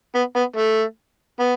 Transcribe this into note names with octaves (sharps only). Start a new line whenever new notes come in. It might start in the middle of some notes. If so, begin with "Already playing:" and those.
B3
B3
A3
B3